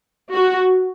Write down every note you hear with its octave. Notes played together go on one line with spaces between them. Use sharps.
F#4